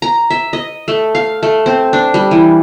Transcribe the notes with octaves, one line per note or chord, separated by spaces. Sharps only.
A#5
E5
D#5
A3
F5
A3
C4
D4
G3
E3